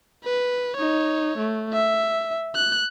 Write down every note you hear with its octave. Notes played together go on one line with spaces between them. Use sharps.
B4
D#4 C#5
A3
E5
F#6